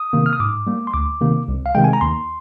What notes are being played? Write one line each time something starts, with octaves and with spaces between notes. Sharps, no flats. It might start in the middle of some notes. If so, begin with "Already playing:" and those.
Already playing: D#6
C3 D#3 A#3
F6
D#6
G#2 D6
G3 A#3
C6
D2 D6
C3 D#3 A#3
C2
F5
C3 D#3 G#3 G5
G#5
A#5
D#2 C6